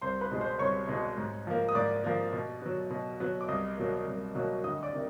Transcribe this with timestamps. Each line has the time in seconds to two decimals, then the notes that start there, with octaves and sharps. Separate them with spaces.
0.02 C2 C5 C6
0.21 B4 B5
0.31 B2 G#3
0.41 C5 C6
0.59 C2 C#5 C#6
0.89 B2 G#3
1.18 G#2
1.47 F3 A#3
1.69 D#6
1.75 G#2 D5 D6
2.04 F3 A#3
2.33 B2
2.62 F#3 B3
2.90 B2
3.20 F#3 B3
3.41 D6
3.48 C2 D#5 D#6
3.77 B2 F#3 A#3
4.06 C2
4.35 B2 F#3 A#3
4.64 D2 D#5 D#6
4.83 D5 D6
4.93 C3 D#3